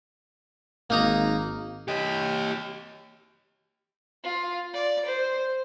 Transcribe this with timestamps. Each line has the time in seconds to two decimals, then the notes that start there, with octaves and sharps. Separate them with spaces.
0.90 G#1 A#3 D#4 A#5
1.88 G4 D#5
4.24 F4
4.73 D5
5.05 C5